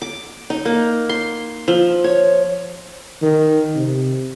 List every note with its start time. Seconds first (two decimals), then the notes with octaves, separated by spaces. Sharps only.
0.02 D6
0.50 D#4
0.65 A#3
1.09 C6
1.68 F3
2.04 C#5
3.22 D#3
3.76 C3